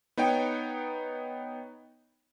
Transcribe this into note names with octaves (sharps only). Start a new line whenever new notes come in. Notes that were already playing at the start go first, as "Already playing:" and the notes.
B3 D#4 C#5 G5